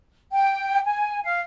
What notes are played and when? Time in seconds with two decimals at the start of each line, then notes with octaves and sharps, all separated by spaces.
0.33 G5
0.84 G#5
1.24 F5